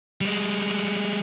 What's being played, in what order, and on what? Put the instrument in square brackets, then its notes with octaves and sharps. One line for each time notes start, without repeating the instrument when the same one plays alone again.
[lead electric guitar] G3 G#3